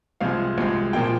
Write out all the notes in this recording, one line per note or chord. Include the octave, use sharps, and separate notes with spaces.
C2 C3 F3 G#3 F5
C2 C3 F3 G#3
A#2 F3 A#3 G5